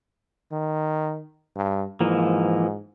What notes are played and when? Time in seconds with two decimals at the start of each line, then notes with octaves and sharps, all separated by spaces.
0.52 D#3
1.56 G2
2.01 G#2 E3 F3 A#3